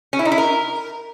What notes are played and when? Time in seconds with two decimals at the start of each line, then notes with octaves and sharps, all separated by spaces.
0.13 C#4
0.19 E4
0.25 D#4
0.32 E4
0.38 A#4